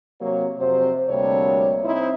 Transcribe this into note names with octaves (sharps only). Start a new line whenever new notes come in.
C3 F#3 A#3 C#5
F2 C3 F#3 C5
D2 C3 G3 A#3 D4 C#5
C4 D#4 E4 C5